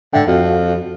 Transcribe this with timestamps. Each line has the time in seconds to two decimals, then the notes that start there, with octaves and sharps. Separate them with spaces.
0.13 G#2 D3 E5 G5
0.27 F2 F#4 A4 F5